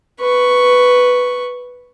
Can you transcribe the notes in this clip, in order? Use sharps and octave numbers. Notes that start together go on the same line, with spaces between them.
B4 C#6